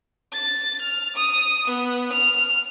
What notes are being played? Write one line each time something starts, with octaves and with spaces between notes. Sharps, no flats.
A6
F6
D#6
B3
F6